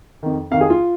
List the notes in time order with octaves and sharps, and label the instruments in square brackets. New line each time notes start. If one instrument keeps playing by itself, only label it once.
[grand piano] F2 D#3
F2 D#3 F5
G#4
F4